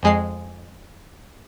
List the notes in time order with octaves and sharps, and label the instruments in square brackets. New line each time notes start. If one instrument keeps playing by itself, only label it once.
[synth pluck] F2 G#3 C7